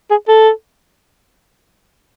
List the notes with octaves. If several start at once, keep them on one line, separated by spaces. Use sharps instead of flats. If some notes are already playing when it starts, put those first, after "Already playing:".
G#4
A4